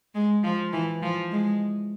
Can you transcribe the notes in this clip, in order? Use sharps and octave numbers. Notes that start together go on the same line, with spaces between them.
G#3
F3
E3
F3
G#3